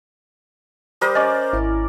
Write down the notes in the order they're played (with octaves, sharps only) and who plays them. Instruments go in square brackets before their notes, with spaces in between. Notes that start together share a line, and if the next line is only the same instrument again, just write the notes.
[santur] G3 A#4 D#6 [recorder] C5
[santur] C#4 D5 [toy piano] D#5 [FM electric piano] A6
[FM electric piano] G#1 E4